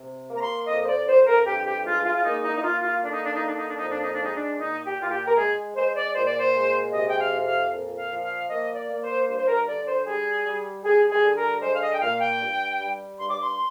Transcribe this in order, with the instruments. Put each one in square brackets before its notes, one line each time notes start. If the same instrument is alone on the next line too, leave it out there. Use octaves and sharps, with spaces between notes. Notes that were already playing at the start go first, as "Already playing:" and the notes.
Already playing: [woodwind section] C3
A#3
A#5
C6
F2 D#5
C5
D5
F2 C5
A#4
G2 G4
G4
G#3 F4
F4
F4
A#3 D#4
D#4
D#4
A#3 F4
F4
D3 D4
D#4
D4
D#4
A#3 D4
D#4
D4
F2 D#4
D4
D#4
D4
G#3 D#4
D4
A#2 D#4
G4
A#2 F4
G4
A#4
G#3 G#4
G#3 C5
D5
A#2 C5
D5
C5
G#3
C3 D#5
G5
F5
F2
F5
A#2
F5
F3
F5
A#3 D#5
D5
A#3
C5
G2 C5
C5
A#4
D3 D5
C5
G3 G#4
G3
G3 G#4
G#4
D3
A#4
G#3 C5
F5
D#5
G5
A#2 F5
G5
G2
G3
G2 C6
D6
C6